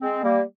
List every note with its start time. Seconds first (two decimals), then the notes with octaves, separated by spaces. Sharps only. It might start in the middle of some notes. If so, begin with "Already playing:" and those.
0.01 G#3 C4
0.23 G3 A#3